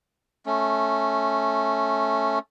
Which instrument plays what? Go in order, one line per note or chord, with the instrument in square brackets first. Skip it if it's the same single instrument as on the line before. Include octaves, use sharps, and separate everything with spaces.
[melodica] A3 C#4